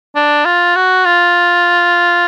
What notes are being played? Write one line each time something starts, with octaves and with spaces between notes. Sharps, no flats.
D4
F4
F#4
F4